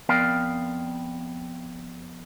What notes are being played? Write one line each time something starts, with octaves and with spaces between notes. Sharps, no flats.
F2 B3 A#4 D5 F5 G5